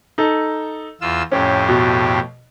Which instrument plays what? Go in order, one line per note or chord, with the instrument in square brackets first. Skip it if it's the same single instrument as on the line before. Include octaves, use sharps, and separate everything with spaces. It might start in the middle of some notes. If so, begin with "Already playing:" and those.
[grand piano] D#4 A4
[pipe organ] E2 F4 E6
[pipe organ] F2 A2 G4 [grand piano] C#4
[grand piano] B2